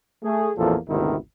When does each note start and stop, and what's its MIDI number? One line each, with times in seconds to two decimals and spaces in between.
0.23 0.51 57
0.23 0.51 68
0.57 0.76 33
0.57 0.76 40
0.57 0.76 46
0.57 0.76 53
0.57 0.76 58
0.57 0.76 69
0.89 1.15 32
0.89 1.15 38
0.89 1.15 48
0.89 1.15 51
0.89 1.15 59
0.89 1.15 64